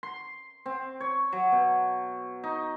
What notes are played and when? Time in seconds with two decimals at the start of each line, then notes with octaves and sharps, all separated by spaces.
0.03 C6
0.66 C4
1.00 C#5
1.32 F#3
1.52 B2
2.44 D#4